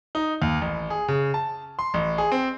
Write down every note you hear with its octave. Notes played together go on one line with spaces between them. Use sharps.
D#4
D#2
A1
G#4
C#3
A5
C6
A1
G#4
C4